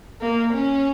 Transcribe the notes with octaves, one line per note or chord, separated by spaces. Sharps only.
A#3
C#4